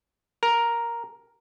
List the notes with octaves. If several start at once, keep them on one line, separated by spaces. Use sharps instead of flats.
A#4